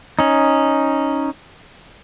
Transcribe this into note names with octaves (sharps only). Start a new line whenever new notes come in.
C#4 D#4